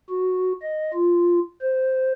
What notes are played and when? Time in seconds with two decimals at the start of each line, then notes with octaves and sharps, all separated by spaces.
0.10 F#4
0.62 D#5
0.94 F4
1.62 C5